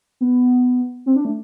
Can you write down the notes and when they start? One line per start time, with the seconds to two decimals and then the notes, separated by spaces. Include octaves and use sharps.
0.21 B3
1.06 C4
1.16 D4
1.25 A3